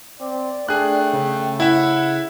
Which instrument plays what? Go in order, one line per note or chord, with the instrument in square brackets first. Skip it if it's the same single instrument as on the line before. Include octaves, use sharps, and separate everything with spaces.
[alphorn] C4 [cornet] D5
[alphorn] A3 [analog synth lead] D4 [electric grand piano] G#4 F#6 [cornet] G5
[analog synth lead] C#3
[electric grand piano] E4 E5 [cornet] F#5